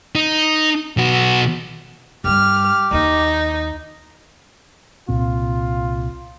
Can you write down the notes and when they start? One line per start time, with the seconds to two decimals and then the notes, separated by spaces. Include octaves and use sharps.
0.15 D#4
0.97 B1 F#4
2.24 G2 G3 G4 F6
2.91 D#2 D#3 D#4
5.09 C2 A#2 C4 F4